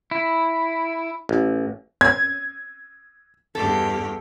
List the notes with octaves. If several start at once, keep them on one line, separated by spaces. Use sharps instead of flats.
E4
A1
G#6
E2 G2 G4 A4